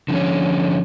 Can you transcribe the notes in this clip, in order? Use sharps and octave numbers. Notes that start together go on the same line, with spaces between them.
D3 F3 C#4